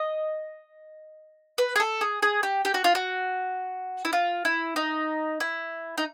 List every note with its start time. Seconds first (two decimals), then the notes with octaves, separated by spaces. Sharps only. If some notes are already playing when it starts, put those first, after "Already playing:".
Already playing: D#5
1.58 B4
1.76 G#4
1.80 A4
2.01 G#4
2.22 G#4
2.43 G4
2.65 G4
2.74 F#4
2.84 F4
2.95 F#4
4.05 E4
4.13 F4
4.45 E4
4.76 D#4
5.40 E4
5.98 D#4